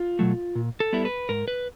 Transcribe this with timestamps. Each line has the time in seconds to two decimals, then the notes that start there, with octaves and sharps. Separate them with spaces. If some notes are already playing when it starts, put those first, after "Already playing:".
Already playing: F4
0.19 B2 F#3 A3
0.55 A#2
0.80 A4
0.93 G3 B3 E4
1.05 B4
1.29 G#2 A#4
1.48 B4